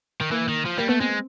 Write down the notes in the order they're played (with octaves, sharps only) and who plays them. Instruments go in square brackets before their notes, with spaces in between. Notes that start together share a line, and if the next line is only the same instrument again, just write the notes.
[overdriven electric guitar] D#3
[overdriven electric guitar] E3 [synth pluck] A#3
[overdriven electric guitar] D#3
F3
[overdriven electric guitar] G3 [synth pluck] A#3
[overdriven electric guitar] A3 [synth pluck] B3
[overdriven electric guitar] G#3 [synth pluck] C4